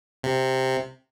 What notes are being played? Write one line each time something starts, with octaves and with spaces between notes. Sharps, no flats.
C3